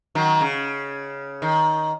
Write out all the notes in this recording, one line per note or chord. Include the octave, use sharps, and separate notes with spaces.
D#3 F#3
C#3
D#3